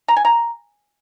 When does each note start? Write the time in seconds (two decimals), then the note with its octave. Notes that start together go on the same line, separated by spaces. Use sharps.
0.08 A#5
0.17 G#5
0.25 A#5